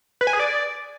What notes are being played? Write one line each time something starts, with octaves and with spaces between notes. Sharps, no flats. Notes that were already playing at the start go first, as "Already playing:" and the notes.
B4
G#5
G#4
D5